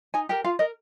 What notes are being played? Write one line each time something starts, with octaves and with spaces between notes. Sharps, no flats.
D#4 G#5
G4 A#4 G5
F4 F5
A#4 D#5